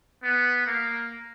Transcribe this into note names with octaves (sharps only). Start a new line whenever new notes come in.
B3
A#3